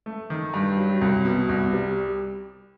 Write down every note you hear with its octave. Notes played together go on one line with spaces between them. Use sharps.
A3
D#3
G2
F#3
C2
B2
C2
G3